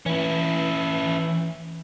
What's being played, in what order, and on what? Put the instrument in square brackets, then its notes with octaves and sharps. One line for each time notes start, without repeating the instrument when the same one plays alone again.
[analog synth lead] E3 [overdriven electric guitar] C#4 E4